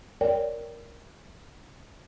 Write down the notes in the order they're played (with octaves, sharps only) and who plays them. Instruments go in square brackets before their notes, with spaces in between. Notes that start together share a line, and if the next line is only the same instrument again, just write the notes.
[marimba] A#4 C#5 D5 G5